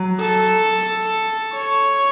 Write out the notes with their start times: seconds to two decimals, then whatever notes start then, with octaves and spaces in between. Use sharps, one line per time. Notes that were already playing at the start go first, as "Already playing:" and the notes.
Already playing: F#3
0.20 A4
1.54 C#5